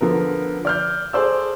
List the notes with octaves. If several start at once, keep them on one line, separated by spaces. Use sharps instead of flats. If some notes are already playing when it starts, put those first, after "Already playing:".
D3 F3 B3 A#4
D5 F6 G6
G#4 A4 C5 D5 E6